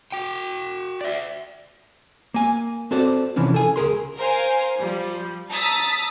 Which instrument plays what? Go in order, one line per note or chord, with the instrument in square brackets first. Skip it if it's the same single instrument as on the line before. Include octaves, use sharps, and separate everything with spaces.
[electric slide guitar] F#4 G5
D5 E5
[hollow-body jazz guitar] A#3 G#5
C4 F#4 A4 C5 D5
C3 E3 F3 C#4 D4
A4 G#5
C#2 G#4 A#4 C6
[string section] A#4 C5 F5 G#5
F3 G3
A5 A#5 D#6 E6 A6 B6